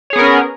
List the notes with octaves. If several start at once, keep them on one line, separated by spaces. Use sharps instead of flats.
B3 C#4 G#4 A#4 C#5